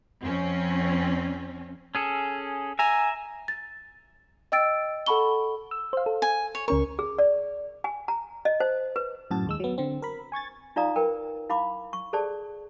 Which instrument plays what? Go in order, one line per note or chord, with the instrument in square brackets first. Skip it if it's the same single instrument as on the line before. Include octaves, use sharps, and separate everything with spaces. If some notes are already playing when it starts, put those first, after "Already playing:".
[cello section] F2 C4 C#4
[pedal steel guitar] C#4 G#4 A4
[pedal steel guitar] E5 A#5 [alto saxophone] G#5
[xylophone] A6
D#5 G5 E6 A6 D7
A4 F#5 A5 B5 C#6 G7
[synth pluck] E6
C5 F5
A4
[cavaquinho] G#5
C#5
[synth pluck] C#2 C#4 A#4 [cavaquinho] C#6
[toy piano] G#4
D5
G#5
A#5
D#5
C5
B4
[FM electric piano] F#2 A2 F#4 A5 A6
D#2 G#3 E6
F#3 B3
D3 C4
A#4 B5
G#5 C#6 G#6 A6
[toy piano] D#4 F4 D5 F5 A#5 D#6
A#4 B4 G5
E4 F5 B5 D6
C#6
G#4 A4 C5 D5 A5